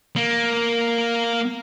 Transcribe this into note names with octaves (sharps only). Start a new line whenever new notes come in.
A#3